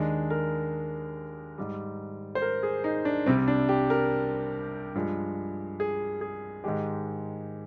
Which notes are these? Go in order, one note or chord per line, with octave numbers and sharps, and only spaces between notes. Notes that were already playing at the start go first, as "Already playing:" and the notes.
Already playing: D#2 D#3 G#3 D4
A#4
G#2 G3
C5
A#4
G#4
D#4
D4
C2 C3 G3 C4
D4
G4
A#4
G2 F3 G#3
G#4
G#4
G#2 D#3 G#3 G4